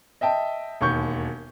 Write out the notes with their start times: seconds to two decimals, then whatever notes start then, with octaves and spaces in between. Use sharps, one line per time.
0.21 D#5 E5 G5 A5
0.81 E1 D#2 C#6 G6